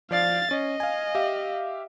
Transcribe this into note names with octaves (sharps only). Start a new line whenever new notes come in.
F3 D5 F5 A6 C7
C#4 D#5
F5 G#5
G4 E5 F5